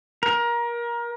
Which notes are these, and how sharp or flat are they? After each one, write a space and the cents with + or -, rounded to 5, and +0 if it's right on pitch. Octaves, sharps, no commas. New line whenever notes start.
A#4 +25